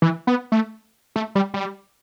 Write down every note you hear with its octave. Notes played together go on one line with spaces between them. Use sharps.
E3
B3
A3
A3
G3
G3